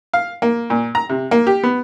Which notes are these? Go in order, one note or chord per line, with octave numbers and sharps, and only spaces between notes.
F5
A#3
A#2
A#5
C3
A#3
G4
B3